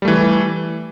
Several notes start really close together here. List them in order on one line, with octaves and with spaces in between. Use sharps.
G3 A3 E3